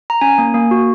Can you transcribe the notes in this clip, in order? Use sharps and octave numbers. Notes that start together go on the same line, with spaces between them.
A#5
C#4 G#5
A#3
A#3
F#4